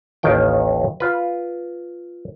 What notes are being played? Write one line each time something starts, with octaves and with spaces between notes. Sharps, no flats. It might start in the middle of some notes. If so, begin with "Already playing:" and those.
A1 D#2 D#3 G5
F4 B4